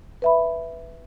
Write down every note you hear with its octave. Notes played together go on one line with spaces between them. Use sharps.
B4 E5 B5